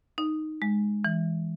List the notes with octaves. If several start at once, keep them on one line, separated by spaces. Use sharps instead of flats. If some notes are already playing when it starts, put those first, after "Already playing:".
D#4
G#3
E3